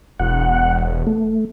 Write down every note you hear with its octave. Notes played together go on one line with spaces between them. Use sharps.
E1 F#5
A3